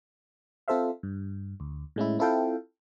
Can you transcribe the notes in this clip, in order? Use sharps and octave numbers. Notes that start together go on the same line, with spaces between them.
C4 F4 A4 C5 E5 F5
G2
D2
A2 G#3 C#4 E4
C4 E4 F4 A4 F5 G5